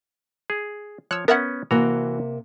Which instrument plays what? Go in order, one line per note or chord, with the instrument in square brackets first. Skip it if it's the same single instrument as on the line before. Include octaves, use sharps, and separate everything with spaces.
[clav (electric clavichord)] G#4
[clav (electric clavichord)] F3 C#5 [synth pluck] E6 F#6
[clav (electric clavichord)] B3 C#4 [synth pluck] A#4 E5 F#5
[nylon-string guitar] C3 A#3 [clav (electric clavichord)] E3 F#4 A#5